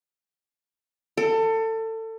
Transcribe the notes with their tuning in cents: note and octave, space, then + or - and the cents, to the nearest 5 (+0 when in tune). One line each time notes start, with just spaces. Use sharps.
A4 +25